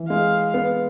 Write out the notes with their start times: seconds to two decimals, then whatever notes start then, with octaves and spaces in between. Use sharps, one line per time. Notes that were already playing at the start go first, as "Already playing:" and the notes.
Already playing: E3
0.10 G#3 F5
0.54 B3